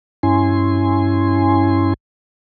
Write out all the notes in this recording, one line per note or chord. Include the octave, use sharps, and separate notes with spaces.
G2 C#4 E4 G#5 C6